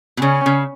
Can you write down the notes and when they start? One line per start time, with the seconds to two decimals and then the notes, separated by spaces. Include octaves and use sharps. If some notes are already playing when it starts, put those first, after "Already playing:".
0.17 B2
0.21 C#3 C#4
0.46 C#3